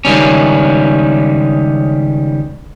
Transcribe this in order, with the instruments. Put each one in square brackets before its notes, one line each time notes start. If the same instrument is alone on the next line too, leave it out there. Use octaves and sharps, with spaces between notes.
[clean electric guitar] C#2 D#3 G3 C#4